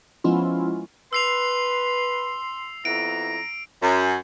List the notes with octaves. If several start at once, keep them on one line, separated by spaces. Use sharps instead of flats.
F3 G#3 B3 C#4 E4 F4
B4 C6 E6 C7 F7
F2 B3 E4 A#5 D7
F#2